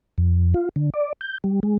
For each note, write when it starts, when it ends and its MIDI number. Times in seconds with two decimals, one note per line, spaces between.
0.18 0.54 41
0.54 0.69 65
0.76 0.90 50
0.94 1.13 74
1.21 1.38 91
1.44 1.60 55
1.63 1.78 56